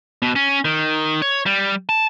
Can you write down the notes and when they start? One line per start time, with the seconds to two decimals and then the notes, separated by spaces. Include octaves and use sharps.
0.22 B2
0.36 C#4
0.65 D#3
1.22 C#5
1.46 G3
1.89 A5